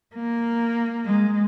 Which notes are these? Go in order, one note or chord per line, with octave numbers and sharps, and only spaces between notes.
A#3
G#3